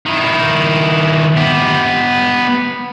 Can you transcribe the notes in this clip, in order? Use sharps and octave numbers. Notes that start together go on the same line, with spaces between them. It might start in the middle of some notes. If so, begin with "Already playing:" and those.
D#3 E4
B3 G4